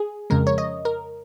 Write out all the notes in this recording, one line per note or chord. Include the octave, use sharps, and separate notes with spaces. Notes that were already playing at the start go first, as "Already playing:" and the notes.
Already playing: G#4
F2 C#3 G#3 A#4
C#5
D#5
A#4